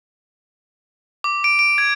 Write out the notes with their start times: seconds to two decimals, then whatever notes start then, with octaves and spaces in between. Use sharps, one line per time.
1.24 D6
1.44 D7
1.59 D7
1.78 G#6